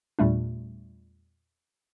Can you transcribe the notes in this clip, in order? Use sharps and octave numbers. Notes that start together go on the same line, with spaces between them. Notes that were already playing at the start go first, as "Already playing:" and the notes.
E2 A#2 G3 A3 D4